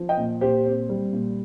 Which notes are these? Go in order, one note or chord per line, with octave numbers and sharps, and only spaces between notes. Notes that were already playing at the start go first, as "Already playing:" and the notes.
Already playing: F3
D#5 G5
A#2
A#2 G4 C5
C4
G3
A#2